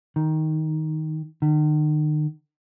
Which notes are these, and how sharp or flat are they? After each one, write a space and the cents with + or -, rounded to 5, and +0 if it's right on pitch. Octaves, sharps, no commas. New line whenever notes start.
D#3 +5
D#3 -40